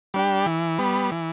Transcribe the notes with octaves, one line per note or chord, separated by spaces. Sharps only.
G3 D4 G4
E3
G3 B3
E3